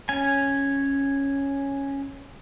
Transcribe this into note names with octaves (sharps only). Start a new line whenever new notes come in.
C#4 G#5